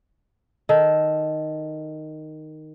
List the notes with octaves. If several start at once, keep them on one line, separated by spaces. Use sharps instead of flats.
D#3 A4